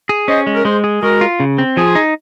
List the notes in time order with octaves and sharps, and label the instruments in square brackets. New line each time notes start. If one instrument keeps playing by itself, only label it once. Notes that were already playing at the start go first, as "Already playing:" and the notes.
[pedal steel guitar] G#4
[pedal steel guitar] C#4 [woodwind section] C5 D#5
[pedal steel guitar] G#3
[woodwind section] A#4
[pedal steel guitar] G#3 [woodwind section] G#4 C5
[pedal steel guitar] G#4
[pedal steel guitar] G#3 [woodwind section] F#4 A#4
[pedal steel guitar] F4
C#3
C4
[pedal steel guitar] F3 [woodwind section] F4 G#4
[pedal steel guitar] D#4